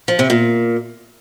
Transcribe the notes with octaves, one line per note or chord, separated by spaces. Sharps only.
F3
C3
A#2